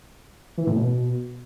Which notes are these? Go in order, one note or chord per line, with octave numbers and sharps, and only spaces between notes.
E3
A2
B2